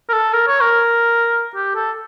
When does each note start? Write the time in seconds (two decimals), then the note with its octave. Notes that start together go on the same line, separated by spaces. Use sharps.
0.09 A#4
0.13 A4
0.33 A#4
0.47 C#5
0.61 A#4
1.55 G4
1.75 A4